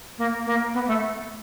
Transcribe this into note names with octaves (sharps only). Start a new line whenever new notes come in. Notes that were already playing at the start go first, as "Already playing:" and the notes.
A#3
A#3
B3
A3